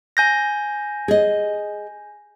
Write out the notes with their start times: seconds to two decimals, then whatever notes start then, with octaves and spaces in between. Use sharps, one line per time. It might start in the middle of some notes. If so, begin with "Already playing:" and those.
0.17 G#5 G6 A#6
1.08 G#4 D#5